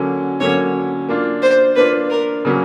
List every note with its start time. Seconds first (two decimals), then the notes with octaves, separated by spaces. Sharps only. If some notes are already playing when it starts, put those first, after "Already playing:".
Already playing: D3 F#3 A#3 C#4
0.40 D3 F#3 A#3 C#4 C#5
1.08 A#3 D4 F4
1.42 C5
1.76 A#3 D4 F4 B4
2.10 A#4
2.45 C#3 F#3 A#3 C#4